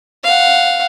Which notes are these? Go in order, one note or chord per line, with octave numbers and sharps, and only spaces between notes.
F5 F#5